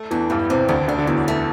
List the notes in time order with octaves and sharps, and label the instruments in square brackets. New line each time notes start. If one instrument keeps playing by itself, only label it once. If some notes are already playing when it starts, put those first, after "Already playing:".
Already playing: [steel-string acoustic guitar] A3
[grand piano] E2 E3 [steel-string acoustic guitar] D4
[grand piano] G2 G3 [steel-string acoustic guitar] E3
[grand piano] C3 [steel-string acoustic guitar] C4
[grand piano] D2 D3 [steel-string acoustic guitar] D4
[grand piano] D2 D3 [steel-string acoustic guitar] D4
[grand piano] D3
[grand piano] E2 E3 [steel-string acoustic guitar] F#3
[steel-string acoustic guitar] A3